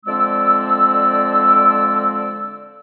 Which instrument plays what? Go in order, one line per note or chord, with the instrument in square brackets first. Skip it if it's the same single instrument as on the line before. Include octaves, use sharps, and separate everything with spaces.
[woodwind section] D3 F3 G#3 C4 D5 E6